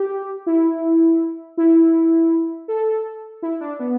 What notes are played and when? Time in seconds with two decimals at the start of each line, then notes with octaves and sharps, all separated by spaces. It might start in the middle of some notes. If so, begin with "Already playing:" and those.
Already playing: G4
0.46 E4
1.57 E4
2.68 A4
3.42 E4
3.61 D4
3.79 B3